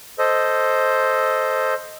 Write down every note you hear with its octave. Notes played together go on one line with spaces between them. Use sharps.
A4 C5 D#5